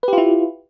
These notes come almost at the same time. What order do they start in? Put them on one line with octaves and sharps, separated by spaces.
B4 G4 F4 E4